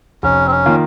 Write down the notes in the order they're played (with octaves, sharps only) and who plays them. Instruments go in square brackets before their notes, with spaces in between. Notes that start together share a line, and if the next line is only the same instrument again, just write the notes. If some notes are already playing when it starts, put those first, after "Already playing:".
[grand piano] F1 [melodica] C#4
[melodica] C4
C#4
[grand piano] D#3 A#3 F4